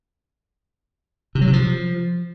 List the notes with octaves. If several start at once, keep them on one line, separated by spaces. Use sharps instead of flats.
C3
F#3
C3
F3